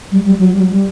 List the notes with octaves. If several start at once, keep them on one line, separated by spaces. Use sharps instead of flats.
G3
G3
F#3
G3
F#3
G3